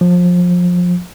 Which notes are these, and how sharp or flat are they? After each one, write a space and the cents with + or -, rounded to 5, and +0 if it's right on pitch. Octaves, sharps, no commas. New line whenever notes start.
F3 +25